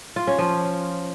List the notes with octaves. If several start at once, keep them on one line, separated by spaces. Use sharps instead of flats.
F4
C#4
F3